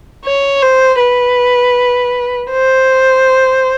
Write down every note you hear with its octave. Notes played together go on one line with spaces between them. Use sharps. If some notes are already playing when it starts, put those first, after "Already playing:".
C#5
C5
B4
C5